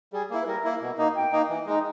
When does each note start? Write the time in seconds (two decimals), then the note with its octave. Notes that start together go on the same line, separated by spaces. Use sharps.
0.12 G3 G#4
0.30 A#3 E4
0.43 B4
0.47 G3 A#4
0.64 A#3 E4
0.81 B2
0.98 A#3 D#4
1.15 B2 G5
1.32 A#3 D#4
1.49 E3
1.66 G#3 D#4